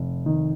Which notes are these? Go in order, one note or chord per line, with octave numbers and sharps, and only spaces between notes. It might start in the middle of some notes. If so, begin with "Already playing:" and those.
Already playing: F1
D#3